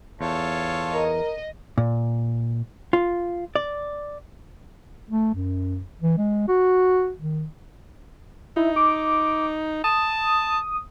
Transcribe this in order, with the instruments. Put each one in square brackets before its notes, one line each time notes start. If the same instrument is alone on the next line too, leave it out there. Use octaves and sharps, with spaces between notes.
[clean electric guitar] E2 [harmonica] F4 A4 C#5
[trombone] A#4 [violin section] D#5
[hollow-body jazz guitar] A#2
F4
D5
[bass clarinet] A3
F#2
E3
G#3
F#4
D#3
[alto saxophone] D#4 [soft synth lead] E4
[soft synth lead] D6
[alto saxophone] A5 [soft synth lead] D#6